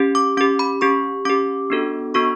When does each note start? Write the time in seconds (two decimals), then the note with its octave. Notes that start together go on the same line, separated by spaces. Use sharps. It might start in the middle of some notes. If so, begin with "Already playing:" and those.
Already playing: C#4 G4
0.15 D6
0.37 C#4 G4 D6
0.59 B5
0.81 C#4 G4 C#6
1.25 C#4 G4 D6
1.70 B3 D4 F#4 A4
2.14 B3 D4 F#4 A4 C#6